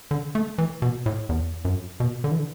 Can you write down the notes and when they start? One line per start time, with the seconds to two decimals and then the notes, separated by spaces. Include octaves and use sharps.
0.11 D3
0.35 A3
0.58 E3
0.82 B2
1.06 A2
1.29 E2
1.65 F#2
2.00 B2
2.24 D3
2.31 E3
2.39 D3